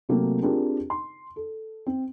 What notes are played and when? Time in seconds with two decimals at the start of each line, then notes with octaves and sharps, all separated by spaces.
0.09 C3 F#3 A3 A#3 C4
0.42 C4 D4 F4 G4 G#4 A#4
0.90 C6
1.36 A4
1.86 C4